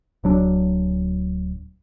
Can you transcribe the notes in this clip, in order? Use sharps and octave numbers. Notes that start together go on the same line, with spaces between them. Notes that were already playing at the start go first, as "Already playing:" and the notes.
D1 F#3 D4